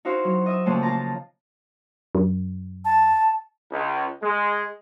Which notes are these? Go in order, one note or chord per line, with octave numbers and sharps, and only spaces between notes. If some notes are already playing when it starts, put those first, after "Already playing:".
D#4 E4 F#4 C5 F5
F#3
D#5 E5 D#6
A#2 C#3 F3 G#3 A3
F4 A5 A#5
F#2
A5
C#2
G#3